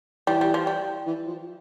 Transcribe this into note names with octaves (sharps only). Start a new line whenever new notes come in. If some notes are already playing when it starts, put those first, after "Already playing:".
E3 G3
G3
F3
G3
E3
F3